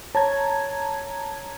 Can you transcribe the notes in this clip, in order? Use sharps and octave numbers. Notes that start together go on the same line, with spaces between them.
C#5 A5 A#5 G#6